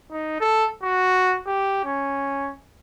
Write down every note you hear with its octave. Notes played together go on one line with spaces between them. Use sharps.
D#4
A4
F#4
G4
C#4